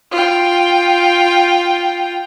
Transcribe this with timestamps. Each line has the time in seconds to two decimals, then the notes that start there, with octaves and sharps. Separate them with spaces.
0.11 F4 G5